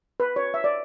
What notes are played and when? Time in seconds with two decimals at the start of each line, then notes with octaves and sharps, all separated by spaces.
0.20 B4
0.36 C#5
0.54 E5
0.64 D5